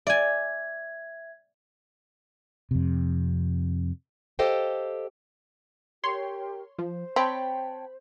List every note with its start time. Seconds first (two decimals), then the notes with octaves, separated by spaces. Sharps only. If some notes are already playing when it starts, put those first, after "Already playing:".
0.07 D5 E5 G#5 G#6
2.71 F2 C3
4.39 G4 A4 C5 D#5 F5 G5
6.04 G4 A#4 C#5 G5 C6
6.79 F3 C5
7.16 C4 C#5 G5 A5 B5